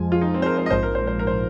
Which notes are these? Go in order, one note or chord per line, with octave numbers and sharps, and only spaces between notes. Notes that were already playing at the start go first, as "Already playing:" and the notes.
Already playing: F2 F3 G#3 G#5
F4
D#4
C4
C5
A#4
C5
D#5
A#1 G#2 F3 C5
A#4
C5
C5
A#4
C5